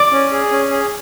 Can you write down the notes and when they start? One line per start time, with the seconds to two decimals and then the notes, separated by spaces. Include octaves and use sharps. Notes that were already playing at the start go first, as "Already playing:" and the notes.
Already playing: D5
0.12 C#4
0.32 G#4
0.51 C#4
0.71 G#4